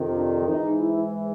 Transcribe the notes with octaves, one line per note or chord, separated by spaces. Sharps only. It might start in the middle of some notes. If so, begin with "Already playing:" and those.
Already playing: F2 C3 D#3
D4
G#2 E3 D#4
E4